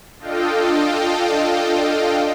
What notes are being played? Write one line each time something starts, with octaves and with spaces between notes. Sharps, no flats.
D4 F4 A4 D#5 F5 G5